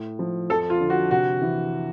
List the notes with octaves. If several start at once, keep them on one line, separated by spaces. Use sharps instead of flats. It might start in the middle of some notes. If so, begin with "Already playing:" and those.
Already playing: A2
F3
F2 A4
F4
D3
F#4
C3 F#4
E3